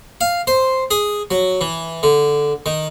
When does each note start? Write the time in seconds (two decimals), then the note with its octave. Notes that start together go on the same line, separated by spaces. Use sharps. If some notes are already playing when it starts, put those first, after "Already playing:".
0.21 F5
0.47 C5
0.91 G#4
1.31 F#3
1.61 E3
2.03 D3
2.66 D#3